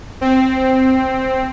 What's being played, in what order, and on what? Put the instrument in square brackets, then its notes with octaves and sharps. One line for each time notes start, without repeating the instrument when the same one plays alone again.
[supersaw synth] C4